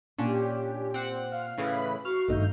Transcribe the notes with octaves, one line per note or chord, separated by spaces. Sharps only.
A#2 C#4 D4 G4
C4 F#5
F5 F6
A2 C#3 E3 B4 B5
F#4 F5 C#6 F6
G#1 G2 A3 D#4 G6